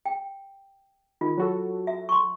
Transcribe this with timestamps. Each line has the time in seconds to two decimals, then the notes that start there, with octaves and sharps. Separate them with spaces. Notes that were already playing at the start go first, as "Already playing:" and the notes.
0.06 G5
1.21 D#3 F4
1.37 F#3 F#4 A4
1.87 E5
2.09 C6 C#6